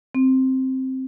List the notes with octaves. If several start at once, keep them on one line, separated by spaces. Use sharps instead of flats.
C4